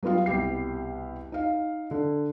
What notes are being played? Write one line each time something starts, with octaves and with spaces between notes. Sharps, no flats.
F#3 G3 B3 F4 F5
C2 B2 G4 C7
D#4 F5
D3